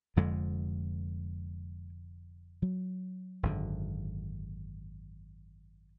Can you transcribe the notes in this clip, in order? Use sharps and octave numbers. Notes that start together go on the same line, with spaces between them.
F1 F2 D3 G#3
F#3
G#1 F#2 D3